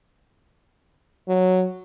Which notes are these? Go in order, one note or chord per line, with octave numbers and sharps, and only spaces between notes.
F#3